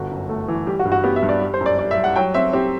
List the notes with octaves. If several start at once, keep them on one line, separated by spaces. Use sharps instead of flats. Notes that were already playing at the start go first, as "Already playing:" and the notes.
Already playing: G1 F#4
F#2
A3
E3
G3 G4
F#4
G2
F#4
B3 G4
E5
G2
D5
G3
C5
F#2
D5
G3 D5
E5
G3
F#5
F#3 G5
C4 E5
C4 G4